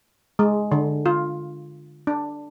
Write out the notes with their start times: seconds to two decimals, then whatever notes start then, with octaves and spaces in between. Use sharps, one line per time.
0.39 G#3
0.72 D3
1.06 F4
2.07 D4